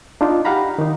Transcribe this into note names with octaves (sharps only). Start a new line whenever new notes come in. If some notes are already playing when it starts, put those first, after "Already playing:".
D4 D#4 F4
G4 F5 F#5 A#5 B5
D#3 D#4